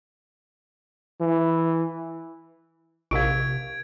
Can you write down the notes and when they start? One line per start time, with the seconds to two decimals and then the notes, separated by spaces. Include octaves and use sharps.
1.21 E3
3.11 A#1 C3 G4 A#4 F5 G#6 D7